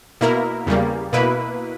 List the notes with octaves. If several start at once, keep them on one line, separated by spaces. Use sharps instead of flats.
B2 A#3 E4 A#4
E2 C#3 G3 A#3
B2 A#3 E4 B4